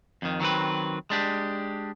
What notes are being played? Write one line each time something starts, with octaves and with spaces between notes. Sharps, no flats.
F2 D#3
D#3 F#3 C4 B4
G#3 D4 G4